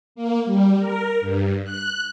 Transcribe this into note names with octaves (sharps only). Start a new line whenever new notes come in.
A#3
G3
A#4
G2
F#6